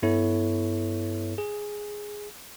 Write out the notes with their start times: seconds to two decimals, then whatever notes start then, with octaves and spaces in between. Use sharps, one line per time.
0.02 G2 B3 E4 A4 C#5
1.38 G#4